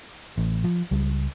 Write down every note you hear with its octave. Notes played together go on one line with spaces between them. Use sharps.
A1
F3
C#2 G3